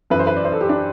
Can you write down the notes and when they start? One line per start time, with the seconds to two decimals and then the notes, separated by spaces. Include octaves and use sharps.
0.10 F#2 E3 B4
0.19 C5
0.27 B4
0.36 D5
0.45 C5
0.52 A4
0.61 G4
0.69 D4